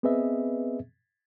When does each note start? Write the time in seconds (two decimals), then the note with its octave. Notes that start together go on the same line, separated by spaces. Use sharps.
0.03 B3 C4 G#4 B4 D#5 E5